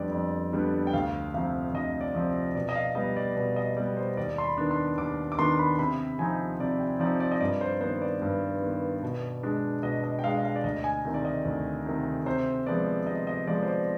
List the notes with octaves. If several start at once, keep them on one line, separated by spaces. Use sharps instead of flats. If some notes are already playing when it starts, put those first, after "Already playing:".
Already playing: F2 D3 G3 B3 D5
F2
D3 G3 B3
G5
D2 F5
C3 F3 C4 F5
D2 D#5
D5
C3 F3 C4
B2 D5
D#5
F5
G3 B3 D#5
D5
B2 D5
D#5
G3 B3 D5
C5
D#2 D5
C6
B5
D#3 B3 D4
C6
D#2 D6
D6
D#3 B3 D4 C6
B5
C3 B5
F3 C4 D#4 G#5
C3 D5
G5
F3 C4 D#4 D5
D5
D#5
G2 D5
C5
D#3 B3 C5
D5
G2
D#3 B3
B2
G#3 D4
B2 D#5
D#5
G5
G#3 D4 F5
D#5
F5
D5
D2 D#5
G#5
C3 D#3
D5
D#5
D2
C3 D#3
C3 C5
F3 G#3 B3 D5
C3 D#5
D#5
F3 G#3 B3 D5
C5
D5